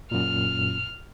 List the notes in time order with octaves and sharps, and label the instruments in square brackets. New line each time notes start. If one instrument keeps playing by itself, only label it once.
[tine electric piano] F#2 A#2 [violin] F6